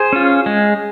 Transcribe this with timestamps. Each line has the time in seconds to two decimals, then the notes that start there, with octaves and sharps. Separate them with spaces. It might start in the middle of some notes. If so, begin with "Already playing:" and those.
Already playing: G#4 C5
0.13 C#4 F4
0.46 G#3